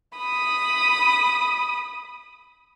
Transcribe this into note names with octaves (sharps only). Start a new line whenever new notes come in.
B5 D#6